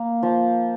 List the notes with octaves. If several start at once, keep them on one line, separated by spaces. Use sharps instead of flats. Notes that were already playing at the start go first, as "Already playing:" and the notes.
Already playing: A#3
F3